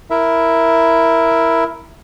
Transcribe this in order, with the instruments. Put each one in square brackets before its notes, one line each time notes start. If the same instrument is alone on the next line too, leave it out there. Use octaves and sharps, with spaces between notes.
[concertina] E4 A#4 E5